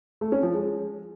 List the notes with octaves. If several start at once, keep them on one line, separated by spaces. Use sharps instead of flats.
A3
C#4
F3
G#3